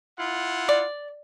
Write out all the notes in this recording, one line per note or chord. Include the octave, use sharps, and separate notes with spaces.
E4 F4 F#5
D5